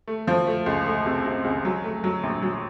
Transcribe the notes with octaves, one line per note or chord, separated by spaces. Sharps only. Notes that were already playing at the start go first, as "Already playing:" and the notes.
A3
F3
A3
C#2
A3
C3
C3
C#2
F#3
A3
F#3
A#1
F#3